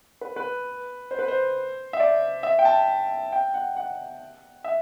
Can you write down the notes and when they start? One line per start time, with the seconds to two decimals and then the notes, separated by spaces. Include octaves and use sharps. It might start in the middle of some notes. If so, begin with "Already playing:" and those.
0.21 B4
0.36 B4
1.11 C5
1.19 B4
1.28 C5
1.93 E5
2.00 D5
2.43 E5
2.59 G5
2.65 A5
3.32 G5
3.54 F#5
3.77 F#5
4.64 E5